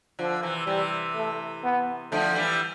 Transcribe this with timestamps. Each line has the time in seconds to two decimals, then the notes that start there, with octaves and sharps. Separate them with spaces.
0.19 D3 F3
0.43 C3 E3
0.67 C3 E3 G3
1.15 A3
1.64 B3
2.12 D3 F3 A3
2.35 E3 G3